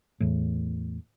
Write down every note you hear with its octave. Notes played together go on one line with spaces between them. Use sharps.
E2 A2